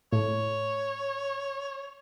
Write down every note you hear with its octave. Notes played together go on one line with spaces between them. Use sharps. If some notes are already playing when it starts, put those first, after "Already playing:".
A2 C#5